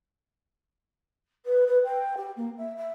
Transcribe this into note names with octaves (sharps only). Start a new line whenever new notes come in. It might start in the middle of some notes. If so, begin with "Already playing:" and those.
B4
B4
G5
G4
A#3
E5
E5